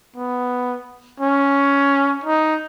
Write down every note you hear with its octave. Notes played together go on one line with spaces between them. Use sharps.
B3
C#4
D#4